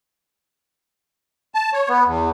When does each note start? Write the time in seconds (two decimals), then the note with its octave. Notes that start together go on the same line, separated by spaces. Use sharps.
1.55 A5
1.73 C#5
1.89 B3
2.06 E2